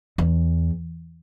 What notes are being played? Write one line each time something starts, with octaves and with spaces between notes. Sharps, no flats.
E2